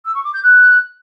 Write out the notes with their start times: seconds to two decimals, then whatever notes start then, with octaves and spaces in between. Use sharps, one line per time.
0.05 E6
0.15 C#6
0.24 D6
0.34 G6
0.43 F#6